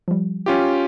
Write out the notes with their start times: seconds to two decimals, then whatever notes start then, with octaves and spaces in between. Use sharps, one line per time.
0.08 F3 G3
0.46 C#4 F4 G4